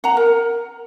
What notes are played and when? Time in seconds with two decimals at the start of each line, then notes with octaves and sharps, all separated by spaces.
0.04 F#5 A#5
0.17 A#4